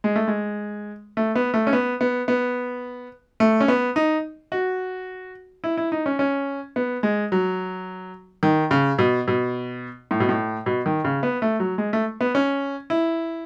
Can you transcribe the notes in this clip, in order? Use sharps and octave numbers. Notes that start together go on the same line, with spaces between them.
G#3
A3
G#3
A3
B3
A3
C#4
B3
B3
B3
A3
C#4
B3
D#4
F#4
E4
E4
D#4
C#4
C#4
B3
G#3
F#3
D#3
C#3
B2
B2
A2
B2
A2
B2
D#3
C#3
B3
A3
F#3
G#3
A3
B3
C#4
E4